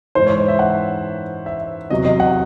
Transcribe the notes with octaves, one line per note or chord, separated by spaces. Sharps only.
G#2 E3 C5
C#5
C#5
E5
F#5
E5
E2 C3 F#3 D#5
D#5
F#5